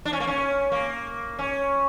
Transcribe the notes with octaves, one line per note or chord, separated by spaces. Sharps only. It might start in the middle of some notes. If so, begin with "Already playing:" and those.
D4
C#4
A#3
C#4
A#3
C#4